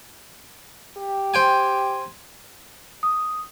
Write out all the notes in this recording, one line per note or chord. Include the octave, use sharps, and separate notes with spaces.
G4
C5 G5 G#5
D#6